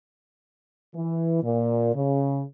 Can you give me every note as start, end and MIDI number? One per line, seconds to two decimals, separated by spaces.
0.94 1.39 52
1.43 1.94 46
1.95 2.42 49